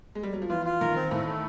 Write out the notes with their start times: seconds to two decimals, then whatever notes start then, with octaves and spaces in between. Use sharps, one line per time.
0.15 G#3
0.23 G3
0.33 F#3
0.42 F3
0.50 E3 F4
0.66 F4
0.81 D#3 A#4
0.96 C4
1.11 A2 A3
1.26 A3